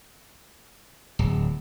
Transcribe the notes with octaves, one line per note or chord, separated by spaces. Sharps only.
D1